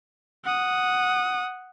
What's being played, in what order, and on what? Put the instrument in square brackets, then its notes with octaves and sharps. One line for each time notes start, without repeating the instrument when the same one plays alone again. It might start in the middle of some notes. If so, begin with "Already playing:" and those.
[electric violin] F#5 D#6